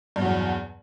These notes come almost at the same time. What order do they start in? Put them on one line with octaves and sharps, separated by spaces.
G2 B2 F#3 E2